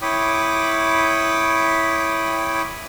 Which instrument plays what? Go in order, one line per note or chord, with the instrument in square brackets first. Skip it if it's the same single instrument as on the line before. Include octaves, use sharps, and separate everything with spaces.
[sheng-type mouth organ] E4 C#5 G5 B5 D6 D#6